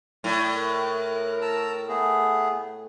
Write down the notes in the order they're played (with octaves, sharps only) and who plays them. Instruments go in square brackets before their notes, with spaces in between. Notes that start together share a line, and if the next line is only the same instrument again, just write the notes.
[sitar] A2 [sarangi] D5
[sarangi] A#4 [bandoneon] F#6
[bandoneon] A5 A#5 E6
A3 B3 G#4